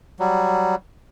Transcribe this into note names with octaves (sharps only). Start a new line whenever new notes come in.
F#3 G3